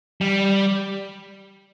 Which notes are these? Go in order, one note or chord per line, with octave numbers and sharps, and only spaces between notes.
G3